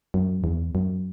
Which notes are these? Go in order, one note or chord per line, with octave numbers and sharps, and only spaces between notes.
F#2
E2
F#2